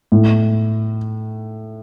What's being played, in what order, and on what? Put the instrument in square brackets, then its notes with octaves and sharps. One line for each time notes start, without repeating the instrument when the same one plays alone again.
[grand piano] A2